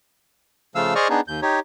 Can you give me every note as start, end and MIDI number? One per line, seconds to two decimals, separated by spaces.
0.75 0.94 49
0.75 0.94 53
0.75 0.94 57
0.75 0.94 77
0.75 0.94 88
0.95 1.08 68
0.95 1.08 72
0.95 1.08 74
0.95 1.08 75
0.95 1.08 85
0.95 1.08 89
1.10 1.21 59
1.10 1.21 62
1.10 1.21 63
1.10 1.21 68
1.28 1.40 39
1.28 1.40 91
1.42 1.60 63
1.42 1.60 67
1.42 1.60 73